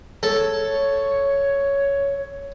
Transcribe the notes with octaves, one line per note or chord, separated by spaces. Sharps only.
A4 C#5